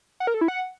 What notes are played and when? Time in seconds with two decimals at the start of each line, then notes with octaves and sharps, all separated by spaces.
0.20 F#5
0.27 A#4
0.34 A4
0.41 E4
0.48 F#5